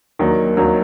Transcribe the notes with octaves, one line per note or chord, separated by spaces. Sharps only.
D#2 D#3 F#3 D4
D#2 D#3 F#3 D4